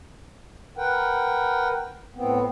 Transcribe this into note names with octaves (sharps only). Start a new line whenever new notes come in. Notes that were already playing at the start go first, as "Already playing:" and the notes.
A#4 B4 F#5 G5
A2 B3 C4